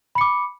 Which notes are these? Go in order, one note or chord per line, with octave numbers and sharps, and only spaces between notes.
B5 D6 C#7